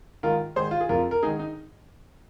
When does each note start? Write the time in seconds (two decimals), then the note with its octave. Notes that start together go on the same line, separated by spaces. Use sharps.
0.23 G#2 D#3 F4 A#4
0.56 G#2 D#3 G#4 C5
0.71 F4
0.81 G#4
0.89 F2 F3 F4 A#4
1.11 A#4
1.23 G#2 D#4 G#4
1.27 D#3
1.39 D#4